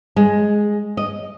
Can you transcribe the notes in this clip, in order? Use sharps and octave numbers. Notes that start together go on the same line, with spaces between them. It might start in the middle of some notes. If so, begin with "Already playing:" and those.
G#3
D#5